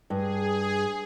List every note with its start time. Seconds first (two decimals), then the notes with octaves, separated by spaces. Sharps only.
0.10 G2 G#4